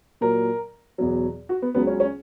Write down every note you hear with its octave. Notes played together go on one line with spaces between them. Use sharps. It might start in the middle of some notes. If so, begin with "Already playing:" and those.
A#2 F#3 A#4
E2 B2 F#3
F#4
B3
C#2 C#3 F#3 B3
C#4
C#4